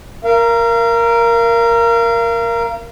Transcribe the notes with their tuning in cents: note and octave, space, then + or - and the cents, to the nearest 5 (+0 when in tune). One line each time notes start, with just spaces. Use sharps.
A#4 +0 F5 -35